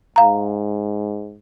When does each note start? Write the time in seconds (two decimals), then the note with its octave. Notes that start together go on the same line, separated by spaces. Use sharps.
0.16 G#2 F5 A#5